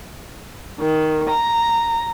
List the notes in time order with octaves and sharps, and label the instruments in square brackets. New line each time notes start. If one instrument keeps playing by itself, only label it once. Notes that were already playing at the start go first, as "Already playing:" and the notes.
[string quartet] D#3
A#5